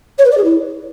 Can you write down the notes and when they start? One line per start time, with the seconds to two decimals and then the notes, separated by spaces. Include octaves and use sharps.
0.18 C#5
0.24 B4
0.31 D5
0.37 G#4
0.43 E4